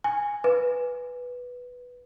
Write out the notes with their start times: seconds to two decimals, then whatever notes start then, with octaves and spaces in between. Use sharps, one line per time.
0.04 G#5
0.44 B4